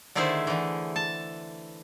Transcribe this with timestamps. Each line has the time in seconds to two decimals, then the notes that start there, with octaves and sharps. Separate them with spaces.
0.15 D3 D#3 A3 E4 G#4 C5
0.47 D3 E3
0.96 A5